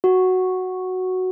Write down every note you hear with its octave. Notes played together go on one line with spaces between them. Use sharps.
F#4